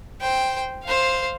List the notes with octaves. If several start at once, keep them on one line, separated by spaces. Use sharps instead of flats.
C5 G5
C5 F5